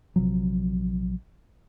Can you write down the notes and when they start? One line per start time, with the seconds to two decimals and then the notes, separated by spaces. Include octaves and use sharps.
0.16 A#1 C3 F3 F#3